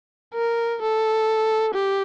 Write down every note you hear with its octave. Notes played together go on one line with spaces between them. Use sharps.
A#4
A4
G4